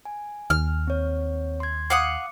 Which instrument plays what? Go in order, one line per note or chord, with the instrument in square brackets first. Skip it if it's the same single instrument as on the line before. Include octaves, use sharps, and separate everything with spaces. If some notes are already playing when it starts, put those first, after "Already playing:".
[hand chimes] G#5
[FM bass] D#2 [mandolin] F6
[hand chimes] C4 C#5
C6 G#6
[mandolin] F5 F#5 D#6 [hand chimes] D6 C#7